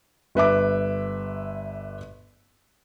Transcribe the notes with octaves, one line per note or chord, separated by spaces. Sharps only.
G1 B4 E5 D6